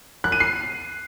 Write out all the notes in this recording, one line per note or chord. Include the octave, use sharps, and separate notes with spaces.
F#6
D#7
C7